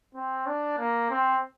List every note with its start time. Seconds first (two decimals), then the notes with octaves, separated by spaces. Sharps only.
0.15 C4
0.47 D4
0.78 A#3
1.10 C4